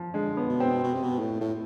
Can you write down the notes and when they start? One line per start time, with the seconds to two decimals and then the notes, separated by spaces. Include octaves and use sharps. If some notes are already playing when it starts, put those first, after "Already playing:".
Already playing: F3
0.14 D3 G#3
0.37 B3
0.49 B2
0.60 C4
0.84 B2
0.93 C3
1.04 B2
1.19 A2
1.41 A2